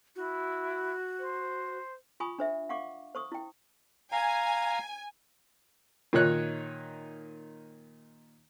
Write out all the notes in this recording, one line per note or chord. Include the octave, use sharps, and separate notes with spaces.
E4 F#4
C5
F4 G#5 B5 C#6 D#6
D4 C5 E5
F5 F#5 C#6 D6
C5 C#6 D#6
E4 G5
F5 G#5 A#5
A#2 D#3 D#4 C#5 F#6